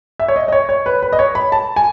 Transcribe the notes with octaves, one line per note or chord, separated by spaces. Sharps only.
E5
C#5
D#5
D#5
C#5
C#5
B4
B4
D#5
C#5
B5
A5
G#5